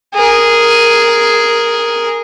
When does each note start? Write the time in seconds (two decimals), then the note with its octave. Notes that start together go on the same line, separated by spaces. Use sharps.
0.14 G#4 A#4